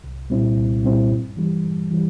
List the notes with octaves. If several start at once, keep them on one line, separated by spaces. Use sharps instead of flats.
C2
A#2 G3 C4 E4
C2
A#2 G3 C4 E4
G2
E3 G3
G2
E3 G3